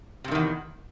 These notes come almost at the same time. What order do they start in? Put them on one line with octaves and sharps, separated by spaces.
C3 G2 D#3 E2